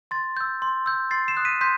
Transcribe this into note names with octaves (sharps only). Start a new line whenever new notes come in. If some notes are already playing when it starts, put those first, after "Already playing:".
C6 A6
E6 G6
C6
E6 G6
C6 A6 C7
C7 E7
D#6 F#6
B6 D#7
C6 G6 B6